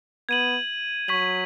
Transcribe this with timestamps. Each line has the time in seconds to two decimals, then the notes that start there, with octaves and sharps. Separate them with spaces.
0.29 B3 G#6 D#7 F#7
1.08 F#3 C#6 G#6 B6 F#7